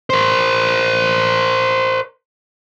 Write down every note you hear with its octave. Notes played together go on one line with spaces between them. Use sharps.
A#4 C5